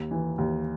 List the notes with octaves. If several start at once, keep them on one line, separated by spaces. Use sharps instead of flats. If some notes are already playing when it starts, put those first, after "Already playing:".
Already playing: D#2
E3
D#2